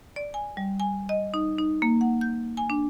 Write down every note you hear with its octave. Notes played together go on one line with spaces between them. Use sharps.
D5
G#5
G3
G#5
D#5
D#4
D#4
A#3
F#5
G6
G#5
D4